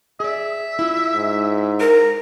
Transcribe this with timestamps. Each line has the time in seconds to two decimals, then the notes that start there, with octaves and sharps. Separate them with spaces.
0.20 G#4 D5 E5
0.79 E4 F4
1.15 G#2
1.80 A#4 A#5